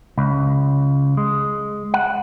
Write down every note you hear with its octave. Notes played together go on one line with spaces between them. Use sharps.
C#2
G#3
F#5